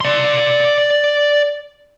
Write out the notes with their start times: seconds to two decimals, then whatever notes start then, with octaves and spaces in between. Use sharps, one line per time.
0.01 D5 C6